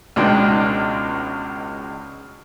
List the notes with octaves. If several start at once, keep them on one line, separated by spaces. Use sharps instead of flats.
C#2 B2 G#3 D4 D#4 G5